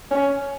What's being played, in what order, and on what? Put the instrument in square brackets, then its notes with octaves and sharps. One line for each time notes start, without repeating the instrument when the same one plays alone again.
[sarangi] C#4